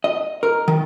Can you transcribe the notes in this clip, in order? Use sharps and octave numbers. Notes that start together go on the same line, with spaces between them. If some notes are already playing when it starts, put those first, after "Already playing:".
D#5
A#4
D#3